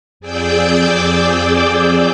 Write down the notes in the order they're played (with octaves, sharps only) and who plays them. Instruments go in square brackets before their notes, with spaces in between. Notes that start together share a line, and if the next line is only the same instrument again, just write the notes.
[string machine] F2 G#4 D5 D6 E6 G6